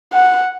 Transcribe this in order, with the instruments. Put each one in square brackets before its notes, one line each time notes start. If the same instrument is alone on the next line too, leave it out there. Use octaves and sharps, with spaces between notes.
[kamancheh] F#5